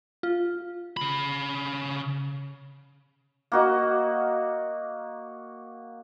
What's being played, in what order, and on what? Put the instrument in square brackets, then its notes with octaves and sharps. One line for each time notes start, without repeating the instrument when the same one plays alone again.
[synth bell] F4
[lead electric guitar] C#3 B5
[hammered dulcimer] A#3 F#4 D#5